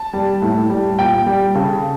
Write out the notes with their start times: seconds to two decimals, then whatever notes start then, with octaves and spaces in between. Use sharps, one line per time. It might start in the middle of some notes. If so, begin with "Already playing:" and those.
Already playing: A5
0.13 G3
0.42 A2
0.70 G3
0.98 A#2 G5
1.26 G3
1.55 C#3 A4